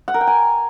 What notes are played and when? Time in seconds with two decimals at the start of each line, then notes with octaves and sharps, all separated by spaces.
0.08 F#5
0.14 A#4
0.21 G5
0.27 G#5